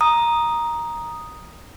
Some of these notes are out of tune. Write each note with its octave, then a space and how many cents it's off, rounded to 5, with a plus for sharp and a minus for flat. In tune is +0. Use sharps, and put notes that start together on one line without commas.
A#5 +10 D#6 +0